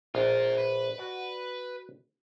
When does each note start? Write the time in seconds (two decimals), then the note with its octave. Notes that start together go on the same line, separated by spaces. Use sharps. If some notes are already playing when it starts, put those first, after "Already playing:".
0.15 A#1 F4 A#4
0.58 B4
0.98 F#4 D5